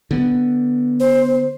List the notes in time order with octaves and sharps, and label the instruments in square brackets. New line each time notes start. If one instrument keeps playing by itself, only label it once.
[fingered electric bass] D3 B3
[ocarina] C5